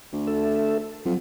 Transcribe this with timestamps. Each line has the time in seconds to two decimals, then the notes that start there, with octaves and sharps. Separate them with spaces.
0.13 D2
0.27 A4 E5
1.05 F2 F#3